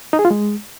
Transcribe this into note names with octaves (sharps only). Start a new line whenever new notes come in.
D#4
G#4
F4
G#3